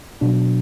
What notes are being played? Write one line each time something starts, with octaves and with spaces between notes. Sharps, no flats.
B2 F#3 D4